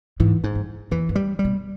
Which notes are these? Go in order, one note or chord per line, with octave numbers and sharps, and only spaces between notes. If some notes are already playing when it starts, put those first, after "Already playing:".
G#2 E3
G#2
G2
E2 E3
G2
G3
G3
B2